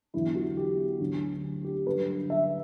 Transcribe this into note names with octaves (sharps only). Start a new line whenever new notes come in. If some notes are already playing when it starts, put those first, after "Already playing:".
E2 D3 F#3 E4
F#4
G4
D2 D3 F#3
G4
G2 D3 F#3 B4
E5